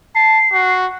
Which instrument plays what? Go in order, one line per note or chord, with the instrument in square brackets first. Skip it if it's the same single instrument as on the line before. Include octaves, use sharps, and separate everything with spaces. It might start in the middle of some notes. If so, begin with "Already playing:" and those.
[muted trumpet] A5 [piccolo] C7
[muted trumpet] F#4